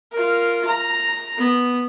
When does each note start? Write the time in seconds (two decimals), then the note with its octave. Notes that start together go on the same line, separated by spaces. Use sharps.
0.12 F4 A#4
0.67 A#5
1.37 B3